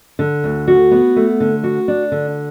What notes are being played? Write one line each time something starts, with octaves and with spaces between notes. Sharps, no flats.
D3
D2
F#4
B3
A3
D3
F#4
D4
D3